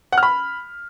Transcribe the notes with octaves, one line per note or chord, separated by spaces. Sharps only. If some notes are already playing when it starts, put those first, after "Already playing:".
F#5
F6
B5